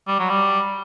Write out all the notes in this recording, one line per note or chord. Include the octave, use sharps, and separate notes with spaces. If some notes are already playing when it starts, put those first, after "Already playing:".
G3
F#3
G3